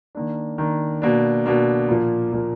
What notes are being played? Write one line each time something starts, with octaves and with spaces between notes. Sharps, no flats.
D#3 A#3 D4
D#3 A#3 D4
B2 A#3 D4
B2 A#3 D4
A#2 F3 A#3
A#2 F3 A#3